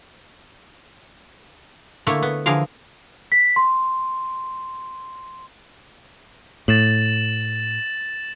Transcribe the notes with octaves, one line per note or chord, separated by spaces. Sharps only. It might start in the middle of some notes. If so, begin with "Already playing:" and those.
D3 A3 A#3 E4 A4 C#5
B3
D3 E3 F3 G#4 A#4 F5
B6
C6
A2 A6 E7 F#7